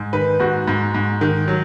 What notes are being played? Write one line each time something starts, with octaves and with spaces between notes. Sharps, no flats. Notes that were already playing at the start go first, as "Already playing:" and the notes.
Already playing: G#2
D#3 B4
G#2 F#4
G#2
G#2
D#3
F#3